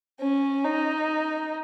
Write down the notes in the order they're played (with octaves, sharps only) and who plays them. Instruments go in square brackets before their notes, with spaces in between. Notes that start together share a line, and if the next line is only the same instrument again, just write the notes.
[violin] C#4
D#4